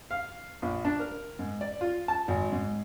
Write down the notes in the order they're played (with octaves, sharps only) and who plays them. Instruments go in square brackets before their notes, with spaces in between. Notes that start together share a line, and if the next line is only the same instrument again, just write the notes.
[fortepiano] F5
A#1
D4
A#4
G#2
D5
F4
A5
G#1
G#2